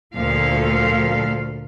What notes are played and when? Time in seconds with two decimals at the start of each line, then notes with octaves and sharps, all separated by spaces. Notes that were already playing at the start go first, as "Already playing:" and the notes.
0.14 D2 A#2 F3 A4 F5